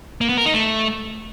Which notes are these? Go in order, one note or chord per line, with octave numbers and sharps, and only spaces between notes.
A#3
B3
A#4
D#4
A3